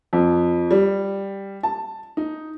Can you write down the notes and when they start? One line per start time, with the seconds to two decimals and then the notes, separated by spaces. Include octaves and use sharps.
0.13 F2
0.71 G3
1.63 A5
2.17 D#4